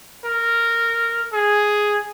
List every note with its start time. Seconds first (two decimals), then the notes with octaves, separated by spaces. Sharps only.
0.25 A#4
1.33 G#4